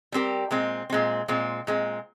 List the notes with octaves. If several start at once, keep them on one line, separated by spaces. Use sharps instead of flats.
G3 C4 G4 A#4
A#2 G#3 C4
A#2 G#3 C4
A#2 G#3 C4
A#2 G#3 C4